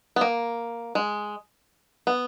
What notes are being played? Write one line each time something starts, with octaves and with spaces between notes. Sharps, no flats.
B3
A#3
G#3
B3